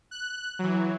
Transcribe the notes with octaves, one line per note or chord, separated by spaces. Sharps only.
F#6
E3 F#3